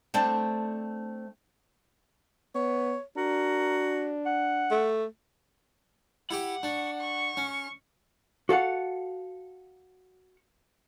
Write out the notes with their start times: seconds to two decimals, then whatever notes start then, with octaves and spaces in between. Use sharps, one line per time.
0.14 A3 C4 D4
2.55 B3 C#5
3.17 D4 F#4 A#4
4.26 F#5
4.71 A3
6.31 E4 G4 F#5 D6
6.63 D4 C#6
7.00 C#6
7.37 C#4
8.49 F#4 A4 F5 F#5